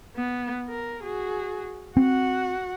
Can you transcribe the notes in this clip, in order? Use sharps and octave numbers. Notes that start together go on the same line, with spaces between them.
B3
A#4
F#4 G#4
C4 F#4 F#5